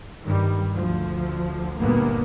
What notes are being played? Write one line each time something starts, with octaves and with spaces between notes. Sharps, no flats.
G2 D#3 G3
D2 F3
G1 D2 G2 A#2 A#3 B3